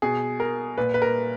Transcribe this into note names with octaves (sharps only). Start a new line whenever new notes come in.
B2 G#4
A#4
A#2 B4
B4
A#4